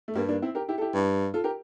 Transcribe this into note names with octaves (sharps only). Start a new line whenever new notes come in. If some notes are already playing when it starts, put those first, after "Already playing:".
A3
G2 G3 A#3
A#3 D4
C4 E4
G4 A#4
E4 G4
A4
E4 G4
G2
F4 A4
G4 A#4